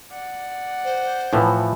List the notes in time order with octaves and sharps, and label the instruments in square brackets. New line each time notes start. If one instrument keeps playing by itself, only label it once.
[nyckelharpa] D5 F#5
[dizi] C5
[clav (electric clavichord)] A2 E3 F3